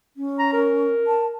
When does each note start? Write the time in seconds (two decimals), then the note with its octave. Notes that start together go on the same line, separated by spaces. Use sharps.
0.17 C#4
0.39 A#5
0.53 A#4
1.07 A5